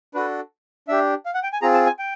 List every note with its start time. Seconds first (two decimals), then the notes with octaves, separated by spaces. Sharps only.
0.14 D4 F#4 A4 B4
0.88 D4 G4 E5
1.26 F5
1.34 F#5
1.43 G5
1.53 G#5
1.62 C4 F4 G#4 A#5
1.74 A5
1.86 G#5
1.99 G5